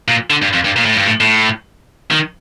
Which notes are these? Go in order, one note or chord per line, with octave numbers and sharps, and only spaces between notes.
A#2
D3
G2
F2
G2
A#2
A2
G2
A2
A2
D#3